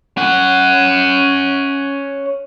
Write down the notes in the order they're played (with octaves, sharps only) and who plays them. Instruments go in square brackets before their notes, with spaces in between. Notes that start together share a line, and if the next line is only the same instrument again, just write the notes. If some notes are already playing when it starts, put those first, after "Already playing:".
[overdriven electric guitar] C#4 F#5